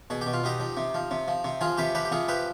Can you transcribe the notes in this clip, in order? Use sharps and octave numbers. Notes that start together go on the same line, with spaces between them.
B2 G#4
G4
B2
F4
B2 D#4 G4
F3
C3
F3
C3
F3
C3
F3 F4 G#4
C3 G4 B4
F3 G4 B4
G4
C3 F4 G#4
F3 G4 B4